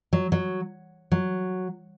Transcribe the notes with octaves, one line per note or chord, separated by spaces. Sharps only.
F#3
F#3
F#3